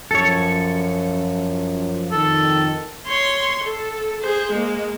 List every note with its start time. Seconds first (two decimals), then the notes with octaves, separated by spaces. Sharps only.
0.11 F#2 F3 A4 C#5
2.12 F2 D#3 A4
3.08 C#5 C6
3.64 A4
4.22 G#4 C5
4.52 G#3 A#3